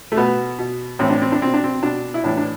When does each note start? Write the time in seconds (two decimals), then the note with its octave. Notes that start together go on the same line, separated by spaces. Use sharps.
0.12 A3
0.16 B2 B3
0.59 B2
0.99 A2 E3 C4
1.10 D4
1.22 C4
1.32 D4
1.41 B2 C4
1.54 D4
1.64 C4
1.82 B2 D4
2.14 E4
2.24 A2 E3 D4
2.37 D4